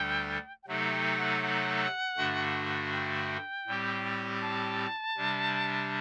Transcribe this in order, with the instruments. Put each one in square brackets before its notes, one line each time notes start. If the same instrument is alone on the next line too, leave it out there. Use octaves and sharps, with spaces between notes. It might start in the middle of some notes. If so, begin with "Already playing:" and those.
Already playing: [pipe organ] D2 D3 G3 D4 A4 [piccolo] G5
[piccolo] G5
[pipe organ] C3 F#3 A3 D#4 A4 [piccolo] F#5
[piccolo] G5
F#5
F#5
[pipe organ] G2 D3 A3 D4 F#4
[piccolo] G5
[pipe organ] A2 G3 C4 G4
[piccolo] A5
[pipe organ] C3 G3 D4